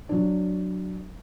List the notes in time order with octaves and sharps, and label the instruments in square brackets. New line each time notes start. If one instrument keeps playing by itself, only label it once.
[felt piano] F#3 D4